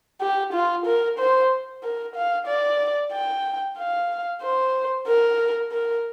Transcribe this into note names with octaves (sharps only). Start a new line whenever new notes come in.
G4
F4
A#4
C5
A#4
F5
D5
G5
F5
C5
A#4
A#4